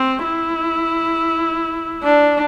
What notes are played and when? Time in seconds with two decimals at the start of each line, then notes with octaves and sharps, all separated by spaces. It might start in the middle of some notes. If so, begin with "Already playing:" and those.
Already playing: C4
0.23 E4
2.03 D4